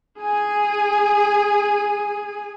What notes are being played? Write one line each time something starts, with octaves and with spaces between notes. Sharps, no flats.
G#4 G#5